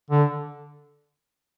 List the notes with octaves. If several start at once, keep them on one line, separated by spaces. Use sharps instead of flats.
D3